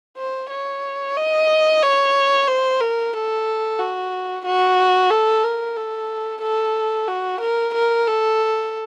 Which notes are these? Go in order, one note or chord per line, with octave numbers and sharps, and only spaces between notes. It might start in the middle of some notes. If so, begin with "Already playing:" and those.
C5
C#5
D#5
C#5
C5
A#4
A4
F#4
F#4
A4
A#4
A4
A4
F#4
A#4
A#4
A4